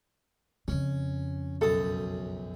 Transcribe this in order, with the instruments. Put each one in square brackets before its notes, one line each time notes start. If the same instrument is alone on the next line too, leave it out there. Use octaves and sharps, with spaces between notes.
[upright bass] F2 C#3 [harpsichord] C#4
[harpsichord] B1 F#2 D#6 [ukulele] A4